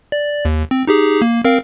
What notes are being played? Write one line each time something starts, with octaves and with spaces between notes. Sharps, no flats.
D5
D#2
C4
D#4 G4 G#4
A#3
C4 A#4 F5